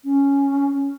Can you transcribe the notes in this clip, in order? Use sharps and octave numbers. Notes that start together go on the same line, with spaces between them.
C#4